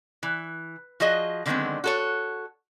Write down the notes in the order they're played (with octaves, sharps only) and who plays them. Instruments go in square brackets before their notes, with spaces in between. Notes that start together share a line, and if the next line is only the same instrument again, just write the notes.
[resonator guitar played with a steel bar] E3
F3 F#4 G#4 D#5
D3 D#3 F#3 G#3 B3 C4
F#4 A4 C#5